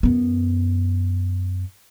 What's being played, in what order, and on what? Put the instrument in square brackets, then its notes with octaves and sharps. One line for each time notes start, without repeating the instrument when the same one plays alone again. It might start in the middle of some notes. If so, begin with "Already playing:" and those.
[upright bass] F#2 B3